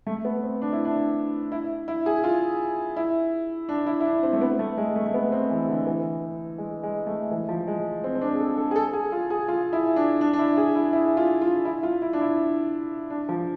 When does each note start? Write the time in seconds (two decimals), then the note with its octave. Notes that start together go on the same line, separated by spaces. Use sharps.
0.07 A3
0.25 B3
0.43 C4
0.62 D4
0.73 E4
0.85 D4
1.52 E4
1.88 E4
2.06 G#4
2.24 F4
2.97 E4
3.69 D4
3.86 E4
4.00 E4
4.05 D4
4.23 C4
4.33 A3
4.41 B3
4.59 A3
4.78 G#3
4.96 A3
5.06 A3
5.14 B3
5.32 C4
5.50 E3
5.68 D3
5.87 E3
6.58 G#3
6.83 G#3
7.07 A3
7.31 E3
7.49 F3
7.68 G#3
8.04 C4
8.15 C4
8.21 D4
8.35 G#4
8.40 A4
8.58 A4
8.71 G#4
8.76 A4
8.93 G#4
9.12 F4
9.30 G#4
9.48 F4
9.73 E4
9.96 D4
10.21 D4
10.33 D4
10.39 E4
10.57 G#4
10.75 E4
10.93 E4
11.17 F4
11.41 F4
11.65 E4
11.83 F4
12.02 E4
12.13 D4
12.20 E4
13.10 D4
13.29 F3